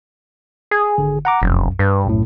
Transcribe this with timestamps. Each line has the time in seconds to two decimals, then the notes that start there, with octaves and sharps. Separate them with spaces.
0.71 G#4
0.98 G#1 D3
1.25 F#5 A#5 D6
1.42 F1 B1 F#2
1.79 G2 B4
2.05 B1 F#2 A2